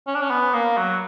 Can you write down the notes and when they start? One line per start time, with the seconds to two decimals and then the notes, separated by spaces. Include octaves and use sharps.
0.07 C#4
0.15 D4
0.22 C#4
0.30 B3
0.54 A#3
0.77 F#3